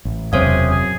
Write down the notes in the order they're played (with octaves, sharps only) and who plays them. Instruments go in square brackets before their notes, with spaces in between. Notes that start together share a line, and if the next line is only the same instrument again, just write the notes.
[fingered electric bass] A1
[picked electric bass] E1 C3 [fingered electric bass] F#2 [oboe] G#4 [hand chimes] C5 C#5 F5
[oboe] G#4